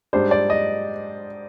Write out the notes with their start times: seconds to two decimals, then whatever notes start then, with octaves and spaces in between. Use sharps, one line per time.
0.13 G#2 G3 D4 C5
0.31 D5
0.50 D#5